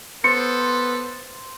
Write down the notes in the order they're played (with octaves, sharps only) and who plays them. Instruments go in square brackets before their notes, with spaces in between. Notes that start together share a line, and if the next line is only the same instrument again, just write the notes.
[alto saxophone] B3 [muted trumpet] A4 [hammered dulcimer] C5 [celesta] C#7